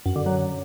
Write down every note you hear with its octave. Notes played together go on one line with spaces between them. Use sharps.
F#2
D3
F#3